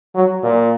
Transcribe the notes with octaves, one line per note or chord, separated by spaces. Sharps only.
F#3
A#2